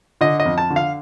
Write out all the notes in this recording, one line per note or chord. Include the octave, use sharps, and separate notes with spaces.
D3 D#5
D#5
F2
A5
D3
F5